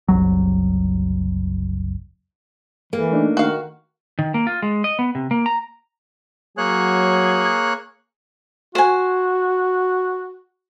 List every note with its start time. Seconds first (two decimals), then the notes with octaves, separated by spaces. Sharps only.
0.08 F#1 C2 F#3
2.93 E3 A#3
3.11 A3 D4 D#4
3.37 D#3 F#4 F5
4.19 D#3
4.34 A#3
4.47 F4
4.62 G#3
4.84 D#5
4.99 B3
5.15 C3
5.31 A#3
5.46 A#5
6.58 F#3 A#3 G#4 C#5 F#6
8.75 F#4 C5 G#5